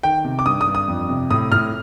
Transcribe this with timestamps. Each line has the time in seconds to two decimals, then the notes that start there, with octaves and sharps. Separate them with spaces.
0.03 D#3 G5
0.25 C3
0.39 D6
0.46 G2 D#6
0.61 D#6
0.67 G2
0.75 D#6
0.88 F2
1.09 C3
1.31 A2 D#6
1.52 A2 F6